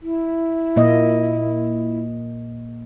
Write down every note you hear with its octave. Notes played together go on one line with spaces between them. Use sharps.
E4
A#2 A#3 D#5